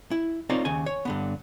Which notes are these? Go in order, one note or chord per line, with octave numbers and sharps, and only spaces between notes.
E4
C4 D#4 F4 A#4 C#5 D5
D#2 C#3 G#5
C#5
G2 D3 B3